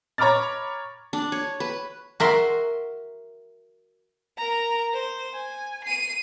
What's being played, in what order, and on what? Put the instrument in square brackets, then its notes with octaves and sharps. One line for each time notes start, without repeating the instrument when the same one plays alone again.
[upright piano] C#5 A#5 B5 D6 F6 A6
[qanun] D4
C#5
B4
[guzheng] F#4 A#4 E5 C6
[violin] A#4 A#5
C5
G#5
C7 D#7